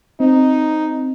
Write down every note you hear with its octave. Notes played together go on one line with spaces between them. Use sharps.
C4 D#4